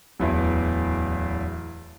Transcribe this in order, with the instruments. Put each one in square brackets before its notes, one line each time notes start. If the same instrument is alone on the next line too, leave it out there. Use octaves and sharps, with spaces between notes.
[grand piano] D1 E2 E3